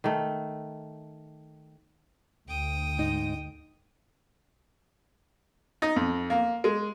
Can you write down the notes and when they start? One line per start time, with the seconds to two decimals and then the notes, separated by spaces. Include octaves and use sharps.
0.04 D#3 A3
2.48 D2 G5 D#6
2.98 G#2 D#4 D#5
5.82 D#4
5.96 F2
6.30 A#3
6.64 G#3